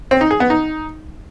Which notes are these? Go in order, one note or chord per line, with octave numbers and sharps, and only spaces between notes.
C4
D#4
G#4
B3
D#4